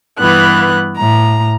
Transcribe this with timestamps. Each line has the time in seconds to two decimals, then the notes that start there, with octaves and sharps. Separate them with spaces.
0.19 G2 E3 B3 F#6
0.96 A2 A#5